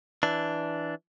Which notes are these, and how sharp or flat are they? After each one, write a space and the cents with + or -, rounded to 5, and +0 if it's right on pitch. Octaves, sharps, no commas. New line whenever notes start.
E3 +0 D4 +0